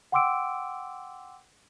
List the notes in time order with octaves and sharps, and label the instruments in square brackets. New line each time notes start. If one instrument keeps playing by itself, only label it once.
[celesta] F#5 G5 C6 D6 E6 D7